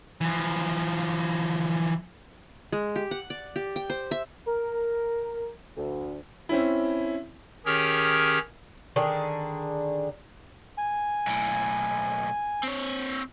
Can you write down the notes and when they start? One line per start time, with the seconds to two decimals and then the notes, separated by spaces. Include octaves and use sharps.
0.21 E3 F3
2.72 G#3
2.96 G4
3.11 F#5
3.30 D5
3.56 G4
3.76 G5
3.90 C5
4.11 E5
4.46 A#4
5.77 D2
6.49 C4 C#4 E4
7.66 D#3 C#4 G4 G#4 A#4 C#5
8.96 D3 D#3 D4 G#4
10.78 G#5
11.27 B1 A2
12.63 C4 C#5